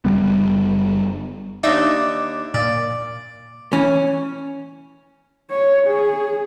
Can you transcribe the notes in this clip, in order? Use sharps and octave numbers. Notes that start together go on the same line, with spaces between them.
F#1 G2 G3 B3
D#2 D4 D#4 E5
A#2 D5
E3 C#4
C#5
G#4